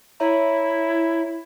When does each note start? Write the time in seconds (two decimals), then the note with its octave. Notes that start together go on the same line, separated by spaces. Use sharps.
0.20 E4 C#5 E5 A#5